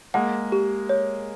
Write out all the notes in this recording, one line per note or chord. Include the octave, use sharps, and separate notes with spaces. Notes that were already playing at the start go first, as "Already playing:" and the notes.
G#3 A#3 F#5
G4
C#5